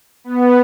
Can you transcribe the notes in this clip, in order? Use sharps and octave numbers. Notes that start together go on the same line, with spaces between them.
B3